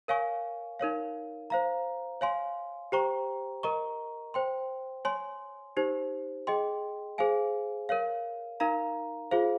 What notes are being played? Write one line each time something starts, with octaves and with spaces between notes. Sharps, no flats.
A#4 C#5 F5 G#5 C#6
D#4 A#4 C#5 F5
C5 F5 A#5
C#5 F5 G#5 C6
G4 C5 G5 A#5 C#6
A#4 D#5 A#5 C#6
C5 G5 C6
C#5 G#5 C6
D#4 G4 C5
G#4 D#5 G5 C6
G#4 C5 F5 G#5
A#4 C#5 F5
D#4 A#4 F5 A#5
F4 G#4 C5 F5